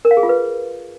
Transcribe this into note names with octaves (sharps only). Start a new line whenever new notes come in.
A#4
F5
G#4
F4
B4